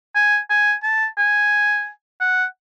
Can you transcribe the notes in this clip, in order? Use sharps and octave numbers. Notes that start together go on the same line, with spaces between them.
G#5
G#5
A5
G#5
F#5